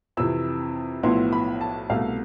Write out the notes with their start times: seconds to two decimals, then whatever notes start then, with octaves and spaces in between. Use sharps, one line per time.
0.17 F2 C3 E3 E6
1.03 B1 A2 F3 B3 E4 C6
1.33 B5
1.61 A5
1.90 C2 B2 A3 F5